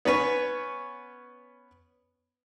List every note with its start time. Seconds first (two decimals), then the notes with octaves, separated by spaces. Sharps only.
0.05 B3 C#4 B4 C#5